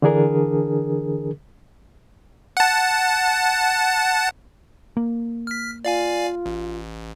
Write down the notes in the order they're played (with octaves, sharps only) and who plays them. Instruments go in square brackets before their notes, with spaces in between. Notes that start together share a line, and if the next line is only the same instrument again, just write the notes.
[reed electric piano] D3 E3 D4 G#4 A#4
[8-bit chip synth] F#5 A5
[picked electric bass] A#3
[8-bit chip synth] F6 B6
[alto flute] F4 [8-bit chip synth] D5 F5 G#5
[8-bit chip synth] A1